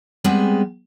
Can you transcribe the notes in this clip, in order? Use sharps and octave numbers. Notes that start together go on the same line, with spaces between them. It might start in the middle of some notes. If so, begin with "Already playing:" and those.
G3 G#3 B3 C4 G#4